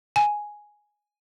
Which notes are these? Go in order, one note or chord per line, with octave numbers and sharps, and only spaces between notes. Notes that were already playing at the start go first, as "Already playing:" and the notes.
G#5